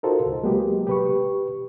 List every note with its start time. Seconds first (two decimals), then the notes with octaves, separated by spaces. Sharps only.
0.03 D#4 F4 F#4 A4 A#4 C5
0.26 C#2
0.43 F#3 G#3 A#3 B3 F#4 G4
0.87 G4 B4 C#6